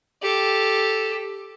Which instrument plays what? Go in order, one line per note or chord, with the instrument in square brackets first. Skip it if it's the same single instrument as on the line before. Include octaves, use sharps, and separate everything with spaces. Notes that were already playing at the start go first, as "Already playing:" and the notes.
[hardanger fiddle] G4 A4